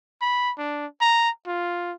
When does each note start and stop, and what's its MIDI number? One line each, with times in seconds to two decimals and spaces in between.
0.22 0.52 83
0.58 0.86 62
1.01 1.30 82
1.47 1.93 65